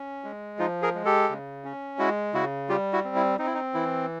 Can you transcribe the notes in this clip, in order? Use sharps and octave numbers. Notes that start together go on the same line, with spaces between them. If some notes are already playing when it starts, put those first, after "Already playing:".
Already playing: C#4
G#3
F3 D#4 F4
G#4 A#4
G#3
G4 A4
C#3
C#4
G#3 E4 F#4
C#3 E4 F#4
G3 F4 G4
E4 F#4
C4
E4
C4 D#4
E4
D#4
E3 E4